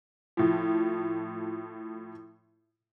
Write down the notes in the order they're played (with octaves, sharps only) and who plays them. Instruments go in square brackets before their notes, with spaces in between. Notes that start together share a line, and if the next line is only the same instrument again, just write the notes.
[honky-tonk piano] A2 F3